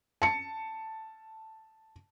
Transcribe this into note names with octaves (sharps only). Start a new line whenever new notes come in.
A5 C#7